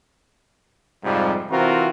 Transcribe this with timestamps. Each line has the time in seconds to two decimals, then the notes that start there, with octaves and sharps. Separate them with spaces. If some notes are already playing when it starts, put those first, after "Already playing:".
1.04 F2 G#2 C3 F3 G3
1.49 C3 E3 C4 F4 F#4 A#4